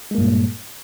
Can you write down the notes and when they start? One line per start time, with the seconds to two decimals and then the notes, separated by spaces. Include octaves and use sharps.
0.11 G#3
0.15 A#3
0.18 G2
0.22 A#2